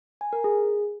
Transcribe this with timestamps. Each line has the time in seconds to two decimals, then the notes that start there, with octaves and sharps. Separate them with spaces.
0.21 G#5
0.33 A#4
0.44 G#4